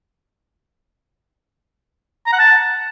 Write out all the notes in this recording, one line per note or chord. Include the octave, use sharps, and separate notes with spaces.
A#5
F#5
A5